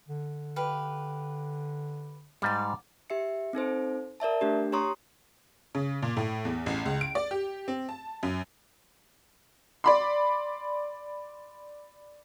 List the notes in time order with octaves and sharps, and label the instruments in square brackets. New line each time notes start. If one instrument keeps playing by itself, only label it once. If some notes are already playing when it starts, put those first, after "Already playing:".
[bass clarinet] D3
[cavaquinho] G4 B4 F5
[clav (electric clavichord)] G#2 G3 [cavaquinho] D5 F5
[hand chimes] G4 E5 C#7
C4 D#4 A4 C5
A#4 D5 E5 A5
A3 D4 G4
G4 C#5 A#5 C6 C#6 D#6
[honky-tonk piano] C#3
A#2
A2
E2
A1
C#2
D7
D5
G4
C4
A5
F#2
[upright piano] D5 B5 C6